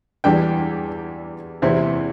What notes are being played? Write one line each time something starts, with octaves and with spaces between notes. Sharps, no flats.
E2 E3 G3 D4 G5
E2 C3 E3 C4 E4